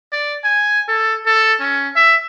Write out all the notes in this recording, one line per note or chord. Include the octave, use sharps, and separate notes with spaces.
D5
G#5
A4
A4
C#4
E5